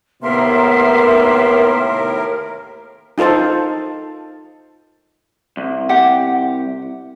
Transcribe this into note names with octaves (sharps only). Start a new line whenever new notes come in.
D#2 A2 C3 A#3 B3 A#4 E5 C6
D#4 F4 A4 C5 A5
C2
G4 F#5